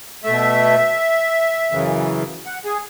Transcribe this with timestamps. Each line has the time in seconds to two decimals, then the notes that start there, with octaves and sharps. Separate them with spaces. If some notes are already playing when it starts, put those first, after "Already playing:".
0.24 B2 A3 E5
1.71 F#2 C#3 E3
2.46 F#5
2.65 G#4